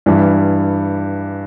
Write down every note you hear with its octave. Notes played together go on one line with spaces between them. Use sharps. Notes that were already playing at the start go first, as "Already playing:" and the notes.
G2 E3 G3